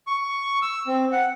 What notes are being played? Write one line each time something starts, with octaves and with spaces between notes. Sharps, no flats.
C#6
E6
C4
F#5